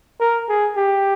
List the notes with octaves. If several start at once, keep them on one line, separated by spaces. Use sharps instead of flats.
A#4
G#4
G4